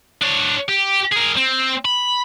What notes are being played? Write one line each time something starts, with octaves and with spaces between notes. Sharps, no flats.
D4 C#5
G4
G#4 A#4
C4
B5